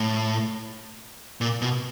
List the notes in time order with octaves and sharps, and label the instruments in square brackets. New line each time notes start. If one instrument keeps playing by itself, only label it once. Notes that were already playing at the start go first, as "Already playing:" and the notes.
Already playing: [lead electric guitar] A2
A#2
B2